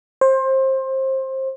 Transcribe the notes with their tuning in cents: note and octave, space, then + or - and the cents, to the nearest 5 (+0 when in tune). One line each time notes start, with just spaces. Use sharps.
C5 +25